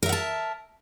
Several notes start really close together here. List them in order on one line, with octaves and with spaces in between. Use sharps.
A#4 E5 F#5 A5